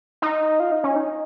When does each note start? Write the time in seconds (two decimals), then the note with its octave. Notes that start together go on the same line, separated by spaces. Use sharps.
0.22 D#4
0.60 F4
0.72 D#4
0.84 C#4
0.96 D#4